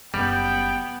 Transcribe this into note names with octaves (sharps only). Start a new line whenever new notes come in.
F#1 G3 B3 G5